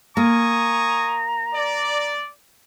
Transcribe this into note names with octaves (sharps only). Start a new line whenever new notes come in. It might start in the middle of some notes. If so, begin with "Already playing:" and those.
A#3 G#5 A#5 C#6 D#6
D5